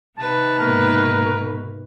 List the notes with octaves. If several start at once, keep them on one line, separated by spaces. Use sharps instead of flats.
C3 D#3 B4 A5
G#2 B2 A#3 A#4